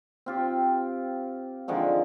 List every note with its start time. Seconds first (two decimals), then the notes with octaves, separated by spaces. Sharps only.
0.26 C4 F4 G4
1.68 D3 D#3 F3 G#3